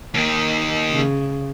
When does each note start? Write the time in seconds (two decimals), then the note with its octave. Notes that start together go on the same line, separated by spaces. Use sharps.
0.14 D#2 D#3
0.90 C#3